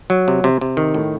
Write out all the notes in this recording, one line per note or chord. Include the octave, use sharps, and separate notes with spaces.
F#3
C3
C3
C3
D#3
A2